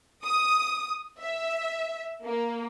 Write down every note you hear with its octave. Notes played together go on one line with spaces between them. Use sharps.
D#6
E5
A#3